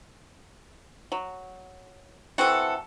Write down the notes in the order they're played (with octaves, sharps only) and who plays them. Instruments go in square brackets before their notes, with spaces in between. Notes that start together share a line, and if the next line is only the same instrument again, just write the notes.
[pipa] F#3
[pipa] E3 C4 F#4 [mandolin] A4 F#5